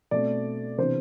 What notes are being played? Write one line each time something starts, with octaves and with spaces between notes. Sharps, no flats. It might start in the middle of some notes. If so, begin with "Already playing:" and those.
B2 A3 C4 D5
C3 E3 B3 D4 C5